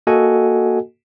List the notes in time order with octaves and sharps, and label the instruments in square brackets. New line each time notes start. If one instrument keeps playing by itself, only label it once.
[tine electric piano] A#3 F#4 A4 D#5 F#5 G#5